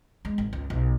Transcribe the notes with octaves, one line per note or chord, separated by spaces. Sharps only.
G#3
G#1
C#2
B1